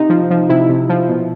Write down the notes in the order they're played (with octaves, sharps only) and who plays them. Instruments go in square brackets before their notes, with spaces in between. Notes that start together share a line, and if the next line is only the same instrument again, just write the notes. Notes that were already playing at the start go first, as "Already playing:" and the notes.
Already playing: [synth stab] C3 D#4
F3
F3
C3 E4
C3
F3
B2